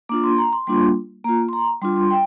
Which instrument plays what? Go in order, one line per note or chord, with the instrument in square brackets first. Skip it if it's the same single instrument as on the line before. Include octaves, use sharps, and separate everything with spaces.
[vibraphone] A#3 D4 F4 D6
C6
A#5
C6
G3 A#3 D4 F4 C6
A#3 A#5
F4
C6
A#5
G3 D4 F4 C6
C6
G5